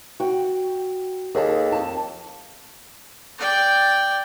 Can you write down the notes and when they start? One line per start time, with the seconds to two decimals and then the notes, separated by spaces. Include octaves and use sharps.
0.20 F#4 G5
1.35 D#2 G#4 A4
1.72 F2 A5
3.38 D5 G5